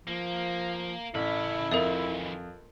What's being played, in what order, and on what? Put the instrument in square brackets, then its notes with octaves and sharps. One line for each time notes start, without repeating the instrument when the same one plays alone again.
[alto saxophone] F3 [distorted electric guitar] A#3
[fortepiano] A1 [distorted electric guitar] C#3 B5 [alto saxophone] E4
[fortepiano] F2 [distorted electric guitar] D#3 E3 [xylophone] A#4 E5